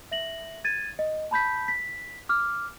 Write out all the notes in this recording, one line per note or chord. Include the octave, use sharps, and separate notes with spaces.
E5 A#6 F#7
G#6 A6 D#7
D#5
A5 B5 G6 B6
B6
D6 F6